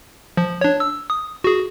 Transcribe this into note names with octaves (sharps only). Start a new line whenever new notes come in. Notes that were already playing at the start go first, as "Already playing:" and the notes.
F3
D4 C#5
E6
D#6
F#4 G#4